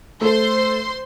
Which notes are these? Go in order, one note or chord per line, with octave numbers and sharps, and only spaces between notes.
A3 A4 C5 C6